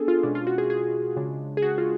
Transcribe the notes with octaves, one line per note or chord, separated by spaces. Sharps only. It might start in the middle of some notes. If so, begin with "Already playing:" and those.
Already playing: B3 D4 G#4 A4 G#5
F4
B2 G#3 C#4 D4
F4
F#4
G#4
G#4
C#3 G#3 D4
G#4
F#4
F4